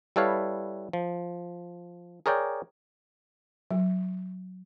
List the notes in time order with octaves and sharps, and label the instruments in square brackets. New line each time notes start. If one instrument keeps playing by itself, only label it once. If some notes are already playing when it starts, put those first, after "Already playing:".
[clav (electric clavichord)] G3 E4 A4 B4 C#5 F5
F3
G#4 A#4 C#5 D5 G5
[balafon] F#3